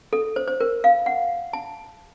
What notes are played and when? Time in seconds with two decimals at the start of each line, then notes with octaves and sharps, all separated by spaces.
0.13 A4
0.36 C5
0.48 C5
0.60 A#4
0.84 F5
1.06 F#5
1.53 A5